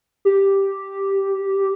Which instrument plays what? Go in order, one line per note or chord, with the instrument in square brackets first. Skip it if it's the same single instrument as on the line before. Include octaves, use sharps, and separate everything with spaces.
[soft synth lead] G4